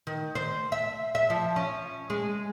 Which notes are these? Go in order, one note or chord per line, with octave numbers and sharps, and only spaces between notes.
D#3
C5
E5
E5
F3
C#4
G#3